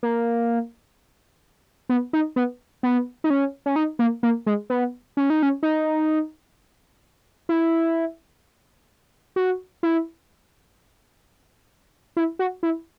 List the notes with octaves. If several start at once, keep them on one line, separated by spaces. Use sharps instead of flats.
A#3
B3
D#4
B3
B3
D#4
C#4
C#4
D#4
A#3
A#3
G#3
B3
C#4
D#4
C#4
D#4
E4
F#4
E4
E4
F#4
E4